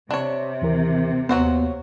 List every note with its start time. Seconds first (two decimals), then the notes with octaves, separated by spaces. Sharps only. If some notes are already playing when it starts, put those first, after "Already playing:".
0.11 C3 D4 C#5
0.62 D#2 E3 A#4
1.29 D#2 F#3 B3 F#4 C5